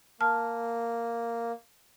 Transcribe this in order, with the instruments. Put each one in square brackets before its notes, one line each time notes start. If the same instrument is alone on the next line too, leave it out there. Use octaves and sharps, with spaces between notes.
[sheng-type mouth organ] A#3 [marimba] A5 F6